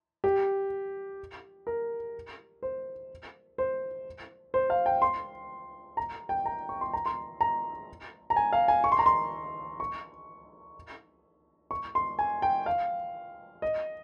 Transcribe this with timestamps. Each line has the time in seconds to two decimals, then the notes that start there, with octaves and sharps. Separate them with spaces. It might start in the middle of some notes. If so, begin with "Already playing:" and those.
0.24 G4
1.67 A#4
2.63 C5
3.58 C5
4.54 C5
4.70 F5
4.86 G5
5.02 C6
5.97 A#5
6.29 G5
6.46 A#5
6.69 C#6
6.81 C6
6.93 A#5
7.06 C6
7.41 A#5
8.30 A#5
8.36 G#5
8.53 F5
8.68 G#5
8.84 C#6
8.92 C6
8.99 A#5
9.06 C6
9.80 C#6
11.71 C#6
11.95 C6
12.19 G#5
12.42 G5
12.66 F5
13.62 D#5